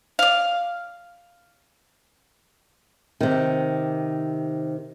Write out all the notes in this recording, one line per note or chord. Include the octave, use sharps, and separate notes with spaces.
D5 F5
C3 D#3